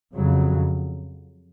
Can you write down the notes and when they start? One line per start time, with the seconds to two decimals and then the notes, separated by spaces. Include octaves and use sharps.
0.15 F2 C#3 F#3